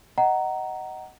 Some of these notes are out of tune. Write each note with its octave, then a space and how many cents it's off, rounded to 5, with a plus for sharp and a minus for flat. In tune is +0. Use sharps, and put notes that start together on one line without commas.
D#5 +0 F#5 +20 A#5 +0